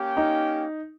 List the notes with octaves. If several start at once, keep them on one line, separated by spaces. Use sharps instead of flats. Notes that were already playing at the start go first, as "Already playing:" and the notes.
Already playing: A#3 C#4 G4
D#4